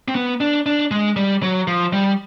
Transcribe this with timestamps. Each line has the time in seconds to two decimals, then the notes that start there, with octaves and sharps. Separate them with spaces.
0.08 C4
0.15 B3
0.41 D4
0.66 D4
0.91 G#3
1.16 G3
1.43 F#3
1.67 F3
1.93 G3